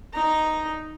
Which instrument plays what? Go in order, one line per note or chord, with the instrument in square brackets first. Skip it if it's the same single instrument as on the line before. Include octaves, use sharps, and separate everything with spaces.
[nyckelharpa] D#4 A#5